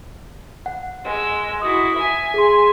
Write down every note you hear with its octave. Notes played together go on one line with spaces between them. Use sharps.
F#5
G#3 E6
E4 F#4 D#6
E5 G#5
G#4 C6